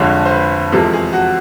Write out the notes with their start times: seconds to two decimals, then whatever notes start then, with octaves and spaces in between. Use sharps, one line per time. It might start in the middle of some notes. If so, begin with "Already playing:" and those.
Already playing: F1 F2 D3 F3 G#3 C#5
0.26 C5
0.32 B4
0.72 E2 C3 F3 G#3 A4
0.93 G#4
1.13 F#4